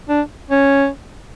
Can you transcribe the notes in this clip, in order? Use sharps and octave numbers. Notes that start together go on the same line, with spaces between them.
D4
C#4